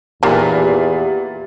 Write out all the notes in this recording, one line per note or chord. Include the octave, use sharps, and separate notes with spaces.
E2 A#2 D#3 E3 A#3 G4